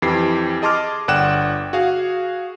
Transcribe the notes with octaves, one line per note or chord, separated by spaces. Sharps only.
F2 E3 G4 C7
G#4 D#5 A5 C6 D6 F6
G1 D5 F#5 G5 F#6 E7
F#4 G#4 F5